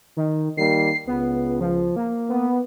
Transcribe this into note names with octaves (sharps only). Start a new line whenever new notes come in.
D#3
D#3 G3 A#3 C7
C#2 B3
F3
A#3
B3